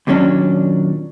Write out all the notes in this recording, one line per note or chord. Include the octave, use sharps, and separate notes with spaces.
D#2 A#2 F#3 A3 C#4 D4